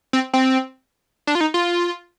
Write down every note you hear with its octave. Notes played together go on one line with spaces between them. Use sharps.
C4
C4
D4
F4
D#4
F4